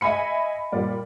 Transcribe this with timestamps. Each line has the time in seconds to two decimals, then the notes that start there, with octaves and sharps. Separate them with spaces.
0.01 D#5 E5 G#5 B5 C#7
0.72 A#2 G3 D5